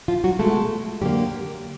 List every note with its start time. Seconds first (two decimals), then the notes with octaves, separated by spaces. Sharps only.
0.08 F3 F4
0.24 F#3 F#4
0.39 B2 G#3 A3 A4
1.01 F2 D3 F#3 G3 A#3 G4